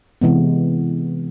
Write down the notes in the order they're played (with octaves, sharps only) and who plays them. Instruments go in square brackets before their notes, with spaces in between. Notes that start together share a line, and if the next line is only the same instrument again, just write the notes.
[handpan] C3 E3 G#3 B3